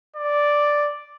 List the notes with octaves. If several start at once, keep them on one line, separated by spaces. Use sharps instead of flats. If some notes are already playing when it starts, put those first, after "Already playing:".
D5